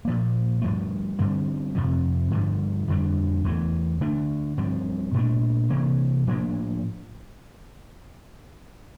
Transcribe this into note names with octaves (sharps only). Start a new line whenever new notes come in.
A#2 F3 A#3
G2 F3 A3
G2 D3 G3 C4
F2 C3 F3
G2 D3 F3
F2 D3 G3 D4
E2 E3 A3
D3 A3 D4
G2 F3 C4
A#2 A3 D4
C3 E3 A#3
A2 F3 A#3 D4